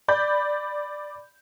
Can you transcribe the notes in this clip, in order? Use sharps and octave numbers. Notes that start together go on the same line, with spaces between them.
D5 B5 G6